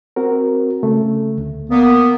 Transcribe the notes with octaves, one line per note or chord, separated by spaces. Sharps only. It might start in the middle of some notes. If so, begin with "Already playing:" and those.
C4 F#4 A#4
C#3 A3
D2
A#3 B3